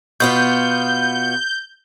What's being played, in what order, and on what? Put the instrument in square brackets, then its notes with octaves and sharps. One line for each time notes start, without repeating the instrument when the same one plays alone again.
[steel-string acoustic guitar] B2 B3 F4 [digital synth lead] G6